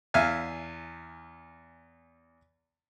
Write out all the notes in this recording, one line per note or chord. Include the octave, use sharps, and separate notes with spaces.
E2 E5 F5 G#5